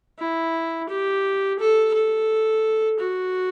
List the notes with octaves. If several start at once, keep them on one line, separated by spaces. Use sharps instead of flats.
E4
G4
A4
A4
F#4